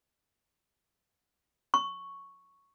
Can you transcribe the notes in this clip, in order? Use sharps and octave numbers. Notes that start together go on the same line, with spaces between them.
C#6